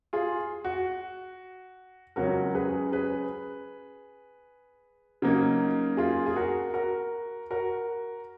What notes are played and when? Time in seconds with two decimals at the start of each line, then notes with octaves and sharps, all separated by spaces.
0.13 F4 G#4
0.65 F#4
2.16 C#2 C#3 F#3 C#4 F#4 A#4
2.55 G#4 B4
2.92 G#4 B4
5.22 C#3 F#3 A#3 D#4
5.97 F4 G#4
6.26 G#4
6.36 F#4 A#4
6.74 F#4 A#4
7.51 F#4 A#4